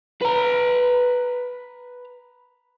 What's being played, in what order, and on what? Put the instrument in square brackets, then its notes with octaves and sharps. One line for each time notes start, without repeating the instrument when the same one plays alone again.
[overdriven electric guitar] B4 A#5